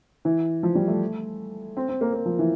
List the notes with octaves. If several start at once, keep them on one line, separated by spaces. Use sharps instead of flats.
E3
F3
G3
A3
C4
C4
A#3
A#3
F3
E3